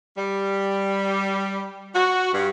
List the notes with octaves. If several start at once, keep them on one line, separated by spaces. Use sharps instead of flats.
G3
F#4
G2